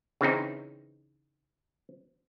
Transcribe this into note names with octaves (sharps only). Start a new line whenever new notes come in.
C#3 E3 C4 D#4